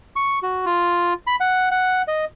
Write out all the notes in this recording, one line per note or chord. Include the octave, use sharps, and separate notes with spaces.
C#6
F#4
F4
B5
F#5
F#5
D#5